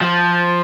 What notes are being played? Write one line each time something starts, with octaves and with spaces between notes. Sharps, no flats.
F3